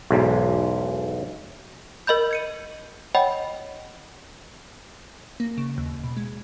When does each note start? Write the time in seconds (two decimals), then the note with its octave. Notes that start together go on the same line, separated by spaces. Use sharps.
0.11 B1 E2 G#2
2.07 A#4 D#5 B5 G6
2.31 G#6 C#7 D#7
3.15 C#5 D#5 F#5 G5 B5
5.40 A#3
5.58 C#3
5.78 D#2
6.04 B2
6.17 G#3